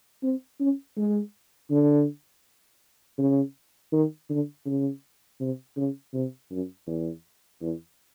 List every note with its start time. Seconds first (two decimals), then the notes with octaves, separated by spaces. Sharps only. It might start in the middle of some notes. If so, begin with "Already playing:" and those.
0.23 C4
0.60 C#4
0.97 G#3
1.71 D3
3.18 C#3
3.92 D#3
4.30 D3
4.66 C#3
5.40 C3
5.77 C#3
6.14 C3
6.51 F#2
6.87 E2
7.61 E2